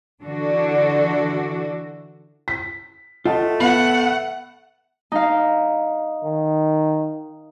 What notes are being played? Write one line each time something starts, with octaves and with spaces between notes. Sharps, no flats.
D3 E3 D4 F#4 A4
B6
A3 F4 D#5 F#5 A5
B3 E5 F#5 B5
D#4 F5
D#3